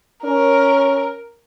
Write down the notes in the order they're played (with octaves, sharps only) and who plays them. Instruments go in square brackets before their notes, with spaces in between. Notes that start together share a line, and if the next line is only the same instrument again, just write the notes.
[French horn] C#4 [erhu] A#4